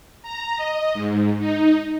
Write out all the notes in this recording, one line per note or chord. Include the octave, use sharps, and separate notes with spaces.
A#5
D#5
G#2
D#4